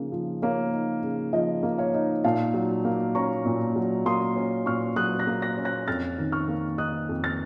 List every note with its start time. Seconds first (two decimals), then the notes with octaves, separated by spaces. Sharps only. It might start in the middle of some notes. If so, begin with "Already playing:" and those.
Already playing: C#3 F3 A#3 D#4
0.12 F3
0.42 A#3 C#5
0.73 D#4
1.03 C#3
1.33 F3 D#5
1.63 A#3
1.78 C#5 F5
1.94 D#4
2.24 A#2 F5 A5
2.54 F#3
2.85 A#3
3.15 C#4 A#5 C#6
3.45 A#2
3.76 F#3
4.06 A#3 C6 D#6
4.36 C#4
4.66 A#2 C#6 F6
4.96 F#3 D#6 F#6
5.19 F#6 A#6
5.27 A#3
5.42 F#6 A#6
5.58 C#4
5.65 F#6 A#6
5.88 F2 F6 A6
6.18 D#3
6.32 C#6 F6
6.48 A#3
6.78 D#4 D#6 F#6
7.09 F2
7.24 F6 A6